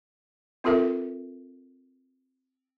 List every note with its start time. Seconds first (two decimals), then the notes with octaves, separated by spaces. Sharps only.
0.64 C4 F4 A4 A#4 E5